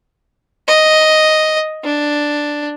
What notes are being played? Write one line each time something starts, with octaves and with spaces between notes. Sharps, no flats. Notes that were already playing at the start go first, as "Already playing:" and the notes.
D#5
D4